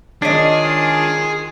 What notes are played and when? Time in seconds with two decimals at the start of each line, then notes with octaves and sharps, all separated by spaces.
0.22 D#3 G#3 D4 F4 G#4 C#5 D#5